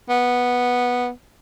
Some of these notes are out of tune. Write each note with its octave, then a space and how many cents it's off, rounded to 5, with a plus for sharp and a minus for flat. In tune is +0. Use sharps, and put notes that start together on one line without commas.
B3 -5